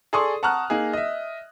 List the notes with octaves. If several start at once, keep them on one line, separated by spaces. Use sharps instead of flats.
G#4 A4 D5 C6 C#6 D#6
F#5 A5 A#5 C#6 F6 F#6
A#3 D#4 G#4
D#5 E5